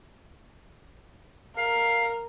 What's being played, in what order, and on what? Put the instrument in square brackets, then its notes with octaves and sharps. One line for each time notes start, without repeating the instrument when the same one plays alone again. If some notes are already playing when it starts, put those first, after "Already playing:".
[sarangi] A#4 [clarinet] F5